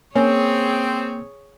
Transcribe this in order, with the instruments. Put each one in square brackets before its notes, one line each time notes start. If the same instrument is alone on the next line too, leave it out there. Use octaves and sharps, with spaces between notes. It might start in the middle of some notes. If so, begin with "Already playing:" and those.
[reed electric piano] A#3 [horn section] C4 [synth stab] C#4 [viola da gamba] G#4 C#5